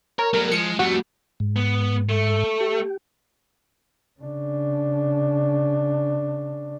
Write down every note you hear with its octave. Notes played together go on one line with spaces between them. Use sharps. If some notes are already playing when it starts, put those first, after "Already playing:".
A#4 C#5
F#3 G3 A3 A#4
F3 G#3 C#7
F2 G3 A3 F#4
G#2
B3
A3
G4
C#3 D4